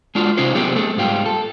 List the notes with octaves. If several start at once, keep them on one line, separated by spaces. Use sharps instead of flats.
G#3 D4 F4 F#4
C3 C#4 D#4 F4 C5
F#3 A3 B3 C4 G4 G#4
A3 G#4 A4
G#2 G3 F4 G4
A4